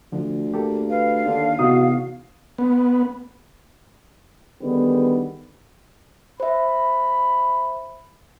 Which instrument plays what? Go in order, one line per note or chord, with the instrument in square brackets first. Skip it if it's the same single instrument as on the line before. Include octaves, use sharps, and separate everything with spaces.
[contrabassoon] D2 [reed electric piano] D3 F3
[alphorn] A#3 [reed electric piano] G4 A4
[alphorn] B4 [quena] F5
[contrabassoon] D#2 [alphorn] D3
[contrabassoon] E2 [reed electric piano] C3 D#4 D#6 [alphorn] F#4
[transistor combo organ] B3
[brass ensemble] D3 D#3 G3 G#3 B3
[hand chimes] C5 E5 [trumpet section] B5